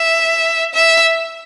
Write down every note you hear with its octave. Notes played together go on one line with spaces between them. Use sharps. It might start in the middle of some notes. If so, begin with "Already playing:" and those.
Already playing: E5
E5